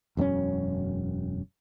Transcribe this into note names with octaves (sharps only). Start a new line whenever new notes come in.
E1 F#2 C4 C#4